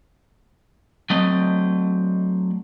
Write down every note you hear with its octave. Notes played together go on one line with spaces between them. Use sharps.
F#3 A3 C4 D#5